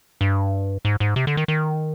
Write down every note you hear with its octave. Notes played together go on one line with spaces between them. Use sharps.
G2
G#2
G#2
C3
D3
D#3
D#3